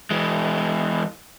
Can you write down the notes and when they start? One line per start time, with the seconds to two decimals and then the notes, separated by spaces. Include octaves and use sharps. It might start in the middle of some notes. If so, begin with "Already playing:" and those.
0.11 E3 G#3